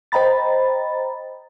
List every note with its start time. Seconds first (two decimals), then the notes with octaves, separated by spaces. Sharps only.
0.12 C5 D#5 G5 A#5 B5 A6